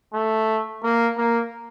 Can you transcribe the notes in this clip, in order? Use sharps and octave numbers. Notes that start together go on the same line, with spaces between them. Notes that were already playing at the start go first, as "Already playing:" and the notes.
A3
A#3
A#3